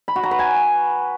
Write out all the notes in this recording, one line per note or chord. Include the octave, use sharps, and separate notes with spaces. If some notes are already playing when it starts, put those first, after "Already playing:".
B5
F#4
A#5
B4
G#5